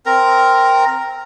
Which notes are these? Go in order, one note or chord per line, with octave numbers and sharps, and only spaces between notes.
C4 A#4 A#5